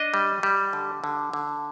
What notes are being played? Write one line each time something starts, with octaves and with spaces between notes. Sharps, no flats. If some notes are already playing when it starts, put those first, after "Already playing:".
Already playing: D4 D#5
G3
G3
D3
D3
D3